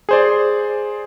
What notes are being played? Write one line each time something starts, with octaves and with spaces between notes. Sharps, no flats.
G#4 C5 D5